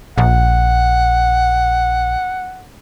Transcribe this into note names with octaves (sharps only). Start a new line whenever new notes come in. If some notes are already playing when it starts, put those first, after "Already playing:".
A#1 F#5